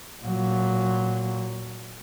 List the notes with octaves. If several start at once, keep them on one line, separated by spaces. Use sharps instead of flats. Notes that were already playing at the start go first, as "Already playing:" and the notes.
A#2 F#3